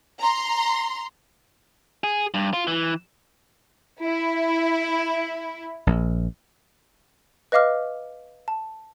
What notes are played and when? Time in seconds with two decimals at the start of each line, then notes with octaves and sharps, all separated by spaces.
0.20 A#5 C6
2.04 G#4
2.34 G2
2.53 F4
2.67 E3
4.04 E4
5.87 A#1
7.52 B4 D#5 F5 D6 F6
8.48 A5